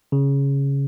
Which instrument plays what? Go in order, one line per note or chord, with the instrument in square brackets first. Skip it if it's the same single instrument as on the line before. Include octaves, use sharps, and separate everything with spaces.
[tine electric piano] C#3